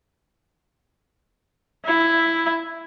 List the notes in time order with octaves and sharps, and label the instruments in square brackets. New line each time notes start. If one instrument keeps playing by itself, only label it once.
[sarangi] E4